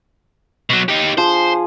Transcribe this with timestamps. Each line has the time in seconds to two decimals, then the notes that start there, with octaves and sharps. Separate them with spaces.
0.70 B2 F#3
0.88 D#4 G4
1.18 F3 G#4 C5